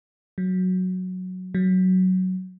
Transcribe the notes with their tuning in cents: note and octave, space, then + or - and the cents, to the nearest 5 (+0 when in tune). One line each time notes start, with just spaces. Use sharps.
F#3 -5
F#3 +5